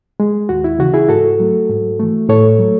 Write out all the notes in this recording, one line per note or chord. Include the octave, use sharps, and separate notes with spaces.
G#3
D#2 F#4
E4
C#3 E3 F#4
E4 G#4
G#2 F#4 A4
F#3 A3
G#2
E3 A3
A2 A4 C#5
F#3 A3